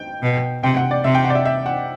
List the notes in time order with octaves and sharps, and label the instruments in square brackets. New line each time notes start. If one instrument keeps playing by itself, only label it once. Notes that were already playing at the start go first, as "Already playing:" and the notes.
Already playing: [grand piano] G5
[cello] B2
[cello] C3 [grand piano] G5
[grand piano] F#5
D5
[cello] C3 [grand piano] E5
[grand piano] G5
F#5
D5
E5
E5
F#5